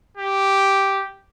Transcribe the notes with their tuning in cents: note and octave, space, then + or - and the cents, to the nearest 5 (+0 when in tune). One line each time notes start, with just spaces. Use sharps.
G4 -5